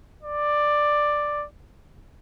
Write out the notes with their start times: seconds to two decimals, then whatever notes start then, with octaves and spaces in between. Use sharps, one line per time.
0.22 D5